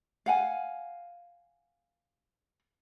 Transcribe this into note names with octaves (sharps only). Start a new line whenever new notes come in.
F5 F#5 G#5